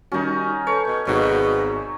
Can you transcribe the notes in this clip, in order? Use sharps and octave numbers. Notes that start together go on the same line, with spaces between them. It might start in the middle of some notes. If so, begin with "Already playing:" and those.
D#3 G3 C#4 D#4 F#4
A4 B4 C#5 A5
B2
G#1 B2 F#3 B3 D#4 G#4 A#4 F5